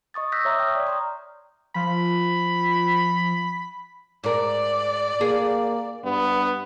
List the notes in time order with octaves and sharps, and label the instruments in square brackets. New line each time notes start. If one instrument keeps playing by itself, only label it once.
[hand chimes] D#5 C#6 D#6 A6
E6 F#6 G6 A#6 B6
C#5 E5 A#5 D6 D#6
G5 C#6 D#6 F6 G6
D5
A#5 C6 D#6
[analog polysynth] F3 [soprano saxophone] B5
[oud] G#2 A#4 [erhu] D5
[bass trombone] A#3 [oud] G#4
[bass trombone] G2 [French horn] B3